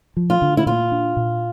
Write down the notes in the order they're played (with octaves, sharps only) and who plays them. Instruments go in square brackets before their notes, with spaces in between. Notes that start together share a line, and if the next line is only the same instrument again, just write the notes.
[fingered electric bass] F3
[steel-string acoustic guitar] F4
[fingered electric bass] D3
[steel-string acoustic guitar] E4
[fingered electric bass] A#2 [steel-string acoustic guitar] F4
[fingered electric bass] D4
A#2